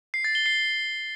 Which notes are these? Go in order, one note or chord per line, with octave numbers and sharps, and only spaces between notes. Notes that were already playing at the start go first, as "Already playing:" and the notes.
C7
A6
G7
C7